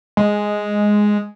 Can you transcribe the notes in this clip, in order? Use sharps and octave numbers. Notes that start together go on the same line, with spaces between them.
G#3